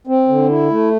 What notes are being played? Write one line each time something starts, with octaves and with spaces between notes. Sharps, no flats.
C4
D3
E4
A3